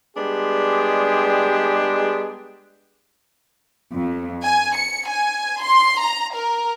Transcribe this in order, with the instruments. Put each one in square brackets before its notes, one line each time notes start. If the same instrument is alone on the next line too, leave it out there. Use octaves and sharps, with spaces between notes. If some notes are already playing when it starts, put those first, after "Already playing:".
[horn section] G3 G#3 B3 D4 G4 G#4
[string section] F2
G#5
C#7
G#5
C6
A#5
A#4